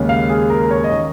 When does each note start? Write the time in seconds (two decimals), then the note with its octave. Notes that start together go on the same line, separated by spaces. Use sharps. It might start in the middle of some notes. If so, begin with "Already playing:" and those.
Already playing: D#2 C#3 G#3 C#4
0.09 F5
0.29 G#4
0.50 A#4
0.71 C#5
0.84 D#5
0.91 D#3 C#4